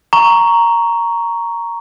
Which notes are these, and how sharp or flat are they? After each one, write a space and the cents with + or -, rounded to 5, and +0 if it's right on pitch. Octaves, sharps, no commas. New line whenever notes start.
A#5 +0 C#6 +10